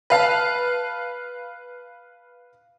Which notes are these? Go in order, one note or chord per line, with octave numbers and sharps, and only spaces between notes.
B4 F5 A5